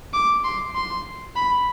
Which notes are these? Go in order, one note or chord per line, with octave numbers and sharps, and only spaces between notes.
D6
C6
C6
B5